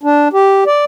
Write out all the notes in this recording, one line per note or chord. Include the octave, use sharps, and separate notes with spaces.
D4
G4
D5